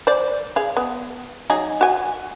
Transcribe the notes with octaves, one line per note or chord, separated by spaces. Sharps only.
C5 D5
G#4 F5
B3
F#3 D#4 G#4
F#4 G#5